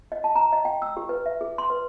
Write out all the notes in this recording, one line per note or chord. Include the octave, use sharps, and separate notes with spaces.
D#5
A5
A#5
D#5
G5
E6
G4
B4
E5
G#4
C6
B4